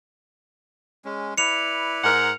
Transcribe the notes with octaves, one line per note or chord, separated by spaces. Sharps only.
G#3 C#4
E4 B4 D5 C#7 F7
G#2 A#4 F#5